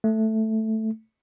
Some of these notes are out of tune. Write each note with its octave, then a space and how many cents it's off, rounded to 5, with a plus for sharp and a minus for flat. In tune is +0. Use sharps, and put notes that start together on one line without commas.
A3 +0